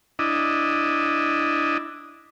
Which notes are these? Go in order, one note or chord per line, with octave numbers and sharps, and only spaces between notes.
D4 E4 D#5